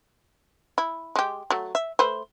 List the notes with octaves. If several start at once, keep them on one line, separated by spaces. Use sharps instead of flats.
E4
G#3 G4
F#3 A3
E5
A3 B4 C5